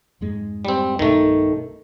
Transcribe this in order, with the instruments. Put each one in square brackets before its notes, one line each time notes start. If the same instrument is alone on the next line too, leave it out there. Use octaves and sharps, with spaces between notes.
[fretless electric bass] F2 G#2 G#3
[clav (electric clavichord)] G3 C4
[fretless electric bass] B1 G2 B2 [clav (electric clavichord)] D#3 A3